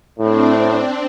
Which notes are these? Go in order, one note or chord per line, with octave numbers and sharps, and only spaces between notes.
A2 C4 D4